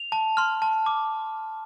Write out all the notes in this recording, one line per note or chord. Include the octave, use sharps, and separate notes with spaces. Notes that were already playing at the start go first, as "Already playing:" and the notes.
Already playing: F7
A5
C6 F6
A5
D6